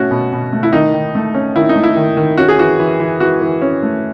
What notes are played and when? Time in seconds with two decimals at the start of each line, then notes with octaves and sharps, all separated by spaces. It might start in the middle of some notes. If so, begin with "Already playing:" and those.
Already playing: B2 A3 C#4 F#4
0.11 B2
0.33 B2
0.53 A3
0.63 E4
0.73 D#3 D#4
0.94 D#3
1.15 A3
1.34 C#4
1.56 D#3 E4
1.69 D#4
1.76 A3
1.83 E4
1.96 D#3
2.17 D#3
2.38 C#4 F#4
2.48 G#4
2.58 E3 F#4
2.79 E3
3.00 E3
3.20 E3 F#4
3.42 E3
3.62 C#4
3.83 A3